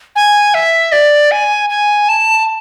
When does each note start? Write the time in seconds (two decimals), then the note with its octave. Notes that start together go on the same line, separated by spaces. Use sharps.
0.16 G#5
0.54 E5
0.92 D5
1.31 G#5
1.70 G#5
2.09 A5